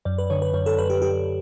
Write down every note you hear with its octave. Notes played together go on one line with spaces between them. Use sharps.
F#2 D5
B4
D3 C#5
B4
F#2 C#5
A4
F#2 B4
G4
F#2 G4